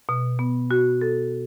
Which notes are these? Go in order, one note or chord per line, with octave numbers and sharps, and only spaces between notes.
B2
B3
F#4
A4